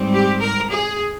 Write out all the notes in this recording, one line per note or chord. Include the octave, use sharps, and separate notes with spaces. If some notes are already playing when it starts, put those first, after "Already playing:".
Already playing: G#2 G3 C4
G4
A#4
G#4